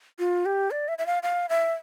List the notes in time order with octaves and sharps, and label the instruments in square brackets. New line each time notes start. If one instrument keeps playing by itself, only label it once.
[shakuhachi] F4
G4
D5
E5
E5
F5
F5
E5